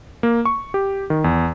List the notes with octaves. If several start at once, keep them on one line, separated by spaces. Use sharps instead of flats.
A#3
C#6
G4
D#3
E2